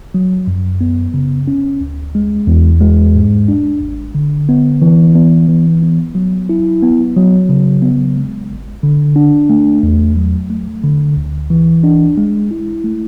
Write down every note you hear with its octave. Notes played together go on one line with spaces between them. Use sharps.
F#3
F#2
B3
C#3
C#4
D2
G#3
E2
G#3
G#2
D4
G#1
D3
B3
E3
B3
E3
B3
F#3
E4
B3
F#3
C#3
B3
G#3
G#1
D3
D4
A3
E2
F#3
A3
D3
D2
E3
D4
G#3
E4
A3